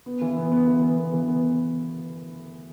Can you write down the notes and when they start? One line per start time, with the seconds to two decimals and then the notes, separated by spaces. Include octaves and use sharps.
0.06 B3
0.21 E3
0.37 B3
0.52 B3
0.67 E3
0.83 B3
0.98 B3
1.13 E3
1.28 B3